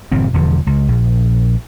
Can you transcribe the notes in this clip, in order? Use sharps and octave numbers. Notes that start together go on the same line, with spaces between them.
G1 A#2 E3 C4
E1 E2 D3 F3
C#2
A#1